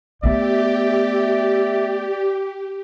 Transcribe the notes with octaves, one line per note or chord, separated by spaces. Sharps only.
A3 B3 G4 D5 E5